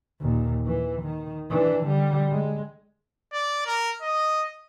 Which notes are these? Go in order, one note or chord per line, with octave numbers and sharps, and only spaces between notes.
D#2 A#2
E3
D#3
E3 D4
D3 G3
G#3
D5
A#4
D#5